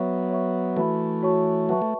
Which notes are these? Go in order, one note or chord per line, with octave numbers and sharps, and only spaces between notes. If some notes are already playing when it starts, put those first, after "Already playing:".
Already playing: F#3 B3 C#5 E5 C#6
C#5 E5 C#6
E3 A3 F#4 B4 E5 B5
F#4 C#5 A5 C#6
F#3 B4 E5 A5 C#6
A3